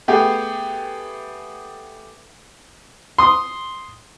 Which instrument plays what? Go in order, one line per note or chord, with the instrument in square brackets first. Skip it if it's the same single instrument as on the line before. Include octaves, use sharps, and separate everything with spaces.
[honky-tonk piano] A3 B3 G4 G#4
[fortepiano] C6 D#6